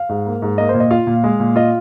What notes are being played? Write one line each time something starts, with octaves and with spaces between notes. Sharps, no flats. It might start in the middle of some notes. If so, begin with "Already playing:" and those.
Already playing: F5
G#2
A#3
G#2
A#3 D#5
C5
A#2
D#5
F4 F5
A#2
G#3
A#2
F4 D#5